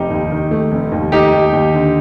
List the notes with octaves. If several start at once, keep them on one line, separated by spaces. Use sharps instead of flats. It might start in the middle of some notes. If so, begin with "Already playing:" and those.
Already playing: F1 D#4 G4
D#2
D#3
A3
F1
D#2
A3 D#4 G4
D#2
D#2
D3